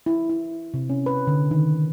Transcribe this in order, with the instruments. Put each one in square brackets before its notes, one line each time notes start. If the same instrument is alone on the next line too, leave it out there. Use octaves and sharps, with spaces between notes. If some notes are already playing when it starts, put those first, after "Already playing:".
[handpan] E4
E4
C3
C#4
B4
D3
D#3